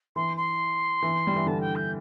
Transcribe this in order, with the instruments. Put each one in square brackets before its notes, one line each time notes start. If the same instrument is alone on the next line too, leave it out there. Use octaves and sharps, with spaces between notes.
[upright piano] E3 [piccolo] C6
[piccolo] C6
[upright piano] E3
G3
E3
[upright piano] D3 [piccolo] A5
[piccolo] G5
G6